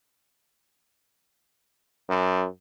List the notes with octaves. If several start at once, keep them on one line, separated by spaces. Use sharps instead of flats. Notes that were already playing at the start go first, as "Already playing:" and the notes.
F#2